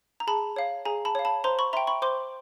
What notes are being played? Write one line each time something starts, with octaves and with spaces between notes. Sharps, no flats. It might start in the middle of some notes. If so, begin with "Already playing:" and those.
A#5
G#4 A5 B5
C#5 F5
G#4 G#5 A#5
A5 B5
C#5 F5
A5 B5
C5 A#5 C6
B5 C#6
E5 G5 A#5 C6
B5 C#6
C5 C6 D6